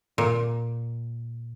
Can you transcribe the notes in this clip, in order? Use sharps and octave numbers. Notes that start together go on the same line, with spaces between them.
A#2